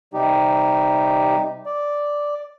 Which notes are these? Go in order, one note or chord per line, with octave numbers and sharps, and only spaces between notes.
C3 G3 D#4 G4
D5